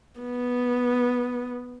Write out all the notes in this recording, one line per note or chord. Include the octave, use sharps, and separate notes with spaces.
B3